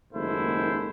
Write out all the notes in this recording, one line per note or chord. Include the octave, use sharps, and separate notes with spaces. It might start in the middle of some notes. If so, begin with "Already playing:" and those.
F#1 D#2 G#2 A3 E4 C5